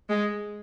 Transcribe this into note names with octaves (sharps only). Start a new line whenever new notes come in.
G#3